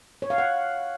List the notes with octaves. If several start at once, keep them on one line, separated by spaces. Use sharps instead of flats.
C#5
F5
F#5